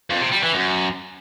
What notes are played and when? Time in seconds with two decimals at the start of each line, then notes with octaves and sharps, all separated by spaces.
0.10 F2
0.21 C3
0.32 G3
0.43 E3
0.54 F#2